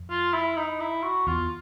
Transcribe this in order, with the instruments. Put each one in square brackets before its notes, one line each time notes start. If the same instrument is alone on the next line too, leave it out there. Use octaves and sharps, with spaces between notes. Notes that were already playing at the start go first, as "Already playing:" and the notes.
Already playing: [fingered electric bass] F2
[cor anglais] F4
E4
D#4
E4
F#4
[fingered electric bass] E2 [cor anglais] F4